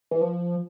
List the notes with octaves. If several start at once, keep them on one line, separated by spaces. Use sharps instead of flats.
E3
F3